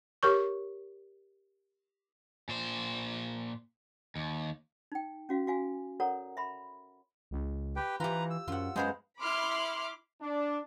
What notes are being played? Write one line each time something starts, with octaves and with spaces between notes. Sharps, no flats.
G4 A#4 C#5 C#6
A#2 C5
D#2
D#4 G5
C#4 F#4 F5
F#4 F5 G#5
A4 A#4 C#5 D5 F#5 A#5
E5 B5 C6
C#2
G4 B4 G5
E3 F4 G4 B4 A#5
E6
F#2 F4 F#5
F#2 G#3 B3 G#4 C5 F5
E4 B5 C6 D6 F6
D4